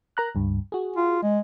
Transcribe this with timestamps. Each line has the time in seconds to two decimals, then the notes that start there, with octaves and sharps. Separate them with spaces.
0.17 A#4 A#5 F#6
0.35 C#2 G2
0.72 F#4 G#4
0.96 F4
1.23 G#3